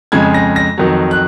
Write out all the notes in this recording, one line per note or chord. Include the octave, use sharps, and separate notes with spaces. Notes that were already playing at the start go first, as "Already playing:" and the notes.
F2 C#3 G#3 G#6
A#6
A#6
F2 D#3 F#3
F#6